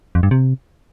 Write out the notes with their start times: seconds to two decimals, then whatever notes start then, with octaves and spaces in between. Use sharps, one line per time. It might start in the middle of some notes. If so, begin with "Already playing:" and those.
0.15 F2
0.23 G2
0.31 C3